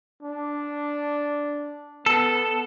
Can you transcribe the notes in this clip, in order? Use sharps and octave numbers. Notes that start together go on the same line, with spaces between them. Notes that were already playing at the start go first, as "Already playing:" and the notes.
D4
B3 A4